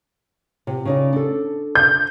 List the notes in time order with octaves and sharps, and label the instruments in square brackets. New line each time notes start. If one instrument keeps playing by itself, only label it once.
[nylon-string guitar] C3
C#3 D#4 D5
D4 A4
[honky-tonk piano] G6